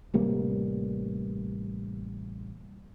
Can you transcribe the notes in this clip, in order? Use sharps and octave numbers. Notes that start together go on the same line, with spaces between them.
A1 C3 G3 A#3